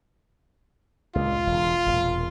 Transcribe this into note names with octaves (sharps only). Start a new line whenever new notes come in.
C#2 A#2 F4
E1
E1 A#2